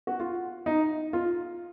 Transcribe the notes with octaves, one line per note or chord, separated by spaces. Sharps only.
F#4
F4
D#4
F4